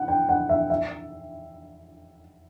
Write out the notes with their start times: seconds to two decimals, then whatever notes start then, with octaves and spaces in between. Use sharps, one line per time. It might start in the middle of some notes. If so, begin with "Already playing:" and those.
Already playing: F#5
0.08 G5
0.29 F#5
0.49 E5
0.70 E5